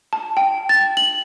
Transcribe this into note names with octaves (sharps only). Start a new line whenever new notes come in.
A5
G5
A6
F#7